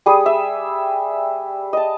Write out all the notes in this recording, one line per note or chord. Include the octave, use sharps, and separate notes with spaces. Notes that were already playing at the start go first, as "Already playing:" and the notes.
G3 G#4 D#6
E5
D#5 A5